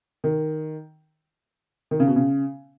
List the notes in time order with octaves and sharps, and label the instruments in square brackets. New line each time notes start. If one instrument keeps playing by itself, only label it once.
[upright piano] D#3
D#3
C#3
B2
C#3